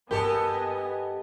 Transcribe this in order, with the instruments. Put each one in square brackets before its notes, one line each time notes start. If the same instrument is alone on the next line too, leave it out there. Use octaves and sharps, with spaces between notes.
[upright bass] G2 D#4 [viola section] B3 D#5 G#5 [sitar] G4 A4 [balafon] A#4